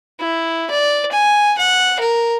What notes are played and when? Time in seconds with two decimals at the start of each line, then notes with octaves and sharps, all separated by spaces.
0.19 E4
0.70 D5
1.12 G#5
1.58 F#5
2.00 A#4